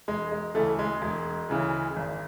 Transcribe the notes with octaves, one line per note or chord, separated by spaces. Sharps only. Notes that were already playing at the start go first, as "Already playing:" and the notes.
E1 G#3
G#3
D2 C#3 E3 A3
G#3
E1 G#3
D2 C#3 E3
G#1